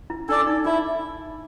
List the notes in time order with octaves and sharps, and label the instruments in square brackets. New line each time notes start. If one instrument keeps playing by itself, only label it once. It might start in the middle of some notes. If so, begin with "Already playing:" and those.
[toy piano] E4
[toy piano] D4 [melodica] A4 D5
[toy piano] D#4
[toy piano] D#4 [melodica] E4